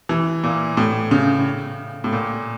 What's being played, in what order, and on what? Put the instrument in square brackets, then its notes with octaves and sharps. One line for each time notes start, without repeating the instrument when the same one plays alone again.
[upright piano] E3
A#2
A2
C#3
A2
A#2